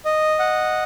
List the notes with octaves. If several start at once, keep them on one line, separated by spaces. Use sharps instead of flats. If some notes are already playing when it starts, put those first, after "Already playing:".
D#5
F#5